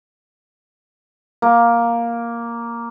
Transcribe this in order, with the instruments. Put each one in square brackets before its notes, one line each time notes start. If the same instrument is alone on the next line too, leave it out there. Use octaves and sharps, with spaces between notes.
[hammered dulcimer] A#3